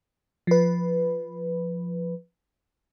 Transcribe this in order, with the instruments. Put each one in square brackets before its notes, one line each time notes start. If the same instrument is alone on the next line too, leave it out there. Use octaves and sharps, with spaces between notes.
[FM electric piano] F3 B4